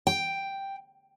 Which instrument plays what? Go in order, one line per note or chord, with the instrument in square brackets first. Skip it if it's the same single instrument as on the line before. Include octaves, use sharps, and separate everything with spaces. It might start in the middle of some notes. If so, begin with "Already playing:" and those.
[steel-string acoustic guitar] G5